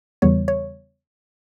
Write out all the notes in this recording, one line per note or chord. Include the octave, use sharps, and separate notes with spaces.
E2 C#3 E3 G3 B3 C#5
C#5